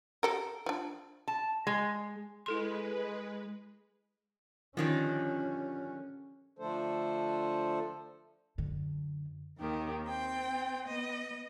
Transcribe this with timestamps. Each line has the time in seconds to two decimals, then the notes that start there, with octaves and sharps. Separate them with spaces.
0.23 G4 A4 A#4
0.66 F3 D4
1.28 A5
1.67 G#3
2.46 G#3 E4 A4 B4 C6
4.77 D3 D#3 F3 G3 C#4
6.59 D3 F3 A3 D4 A4 C5
8.58 F#2 D3
9.58 D#2 D#3 G4
10.05 C4 G5 C6
10.87 B3 D#5